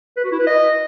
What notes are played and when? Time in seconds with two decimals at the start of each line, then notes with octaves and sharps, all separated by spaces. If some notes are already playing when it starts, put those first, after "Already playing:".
0.17 B4
0.24 F#4
0.32 E4
0.39 B4
0.46 D#5